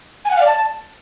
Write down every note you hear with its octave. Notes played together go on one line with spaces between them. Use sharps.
G#5
F#5
F5
D5
A5